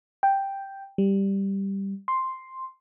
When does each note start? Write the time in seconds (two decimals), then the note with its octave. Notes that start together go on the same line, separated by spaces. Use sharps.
0.23 G5
0.98 G3
2.08 C6